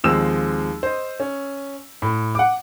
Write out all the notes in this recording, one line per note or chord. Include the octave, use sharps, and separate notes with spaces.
D#2 F3 G#3 C4 E6 E7
C5 D#5
C#4
A2
F#5 D6